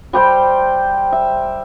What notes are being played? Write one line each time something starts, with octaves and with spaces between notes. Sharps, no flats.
G3 G4 C5 G5
E5